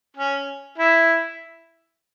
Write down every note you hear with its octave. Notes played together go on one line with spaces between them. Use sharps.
C#4
E4